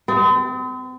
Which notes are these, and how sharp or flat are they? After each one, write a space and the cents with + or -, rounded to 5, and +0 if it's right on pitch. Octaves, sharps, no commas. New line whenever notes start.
C4 -45